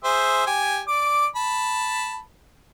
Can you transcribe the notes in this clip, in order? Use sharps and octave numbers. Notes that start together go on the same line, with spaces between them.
G#4 C5 E5
G4 G#5
D5 D6
A5 B5